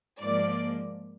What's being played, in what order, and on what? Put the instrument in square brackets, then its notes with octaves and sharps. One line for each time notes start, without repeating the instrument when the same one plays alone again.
[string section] G#2 F3 A#3 D5